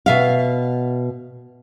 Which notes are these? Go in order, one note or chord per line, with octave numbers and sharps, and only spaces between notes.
B2 E5 F5